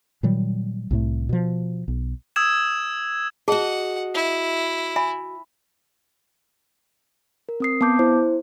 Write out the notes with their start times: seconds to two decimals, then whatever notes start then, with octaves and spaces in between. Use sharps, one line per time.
0.23 A#2 D#3 F#3 G3
0.91 C2 A2 A3
1.29 B2 F3
1.88 B1
2.36 D#6 E6 G#6 E7
3.48 F#4 G#4 D#5 F#5 A5
4.14 E4
4.96 E5 G#5 B5
7.49 A#4
7.60 C4 D#6 C7
7.81 B3 A5 D6 G6
7.99 E4 C5